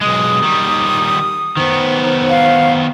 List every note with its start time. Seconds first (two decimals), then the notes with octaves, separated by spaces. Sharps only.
0.02 B1 G#3 D#6
0.43 D#3 G3
1.57 D#3 B3 C5
2.29 F5